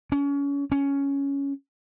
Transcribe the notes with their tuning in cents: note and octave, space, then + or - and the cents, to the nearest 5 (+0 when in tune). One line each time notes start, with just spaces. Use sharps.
C#4 +30
C#4 +10